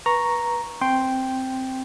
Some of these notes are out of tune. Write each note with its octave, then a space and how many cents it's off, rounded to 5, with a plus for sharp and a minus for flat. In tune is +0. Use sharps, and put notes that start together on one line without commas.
B4 -25 A#5 +0 C#6 -5
C4 +0 G5 +0 C6 +0